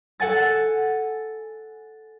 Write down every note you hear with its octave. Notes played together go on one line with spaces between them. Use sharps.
A4 F#5 G#5 A6